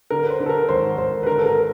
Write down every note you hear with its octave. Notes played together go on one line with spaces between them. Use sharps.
D3 A#4
B4
C5
D3
A4
A#4
G#1 C5
G#1 C5
B4
D3 A#4
A4
A#4